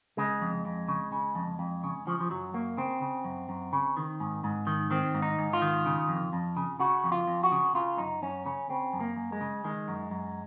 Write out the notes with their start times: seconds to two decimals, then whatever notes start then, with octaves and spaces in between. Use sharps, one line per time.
0.17 C#3 G#3
0.41 F2
0.65 F2
0.88 C#3
1.12 C#3
1.35 F2
1.59 F2
1.84 C#3
2.07 C#3 F3
2.21 F3
2.30 F#2 F#3
2.54 F#2 A#3
2.77 C#3 C4
3.01 C#3
3.25 F#2
3.49 F#2
3.73 C#3
3.97 D#3
4.20 G#2
4.44 G#2
4.67 D#3
4.91 D#3 C4
5.14 G#2
5.22 D#4
5.39 G#2
5.53 F4
5.62 D#3
5.86 C#3
6.09 F2
6.33 F2
6.57 C#3
6.80 C#3 F#4
7.04 F2
7.12 F4
7.27 F2
7.43 F#4
7.52 C#3
7.75 C#3 F4
7.98 F#2 D#4
8.22 F#2 C#4
8.46 C#3 C#4
8.69 C#3 C4
8.93 F#2
9.00 A#3
9.16 F#2
9.32 G#3
9.41 C#3
9.64 D#3 G#3
9.88 F#2
10.11 F#2